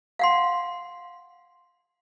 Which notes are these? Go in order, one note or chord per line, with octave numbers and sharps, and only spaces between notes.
F5 F#5 C6